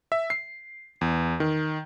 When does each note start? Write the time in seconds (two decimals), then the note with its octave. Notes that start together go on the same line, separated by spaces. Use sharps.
0.12 E5
0.30 C7
1.01 E2
1.40 D#3